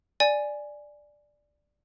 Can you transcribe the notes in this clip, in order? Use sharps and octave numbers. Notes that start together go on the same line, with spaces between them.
D5 G#5